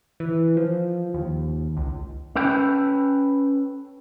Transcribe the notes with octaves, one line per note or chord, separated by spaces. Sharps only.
E3
F3
D#2
C#2
C#4 A4 B4 G5